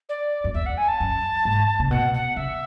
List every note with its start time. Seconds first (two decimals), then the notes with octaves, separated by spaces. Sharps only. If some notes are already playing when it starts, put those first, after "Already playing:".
0.09 D5
0.44 F#2
0.54 E2 E5
0.66 F#5
0.77 G#5
0.88 A5
1.00 F#2
1.45 G#2
1.80 C#3
1.91 B2 F#5
2.14 F#5
2.36 C#3 E5